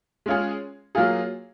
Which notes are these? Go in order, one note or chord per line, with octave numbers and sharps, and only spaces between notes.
G#3 C#4 F4 G#4
F#3 A#3 F4 G#4